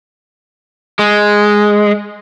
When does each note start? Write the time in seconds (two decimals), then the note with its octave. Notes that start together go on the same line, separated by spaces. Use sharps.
0.99 G#3